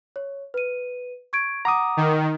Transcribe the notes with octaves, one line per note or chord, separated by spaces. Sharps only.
C#5
B4 D#7
C#6 G#6 D7
F#5 A#5 D6 D#6
D#3